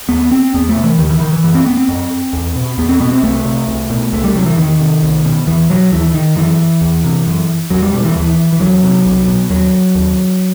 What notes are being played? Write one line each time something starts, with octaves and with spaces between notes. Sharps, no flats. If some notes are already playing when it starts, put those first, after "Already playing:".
D#2 B3
C4
E2 B3
A3
C3
E3
D#2 D#3
E3
D#3
E3
F#2 E3
C4
B3
C4
F#2
E2
B2
E2 B3
C4
B2 B3
C4
C2 A3
C3
C2
B2
C2 A3
G3
C3 F#3
E3
E2 D#3
C3
C2
B2
E2 E3
B2 F#3
D#2 E3
D#3
F#2 E3
E2
C3
F#2
E2 F#3
G3
B2 G3
E3
D#2 E3
E3
E2 F#3
C3
C2
B2
D#2 F#3
D#2